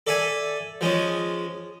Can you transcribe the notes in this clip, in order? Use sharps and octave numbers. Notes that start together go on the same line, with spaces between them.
A4 D5 E5 G#5
F3 G#3 C#4